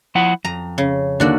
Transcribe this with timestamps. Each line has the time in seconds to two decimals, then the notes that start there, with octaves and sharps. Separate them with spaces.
0.15 F3 E4 F#5
0.45 F2 A#5
0.78 C#3
1.20 D#2 D3 A#3 D4 F#4 D5